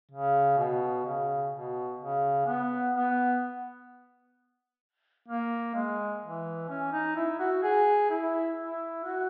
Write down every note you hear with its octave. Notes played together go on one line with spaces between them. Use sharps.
C#3
B2
C#3
B2
C#3
B3
B3
A#3
G#3
E3
C#4
D#4
E4
F#4
G#4
E4
E4
F#4